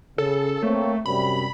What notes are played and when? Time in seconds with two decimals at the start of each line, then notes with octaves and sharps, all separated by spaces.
0.18 C#3 A4
0.63 A3 A#3 C4 C#5
1.06 F#2 C3 G3 B5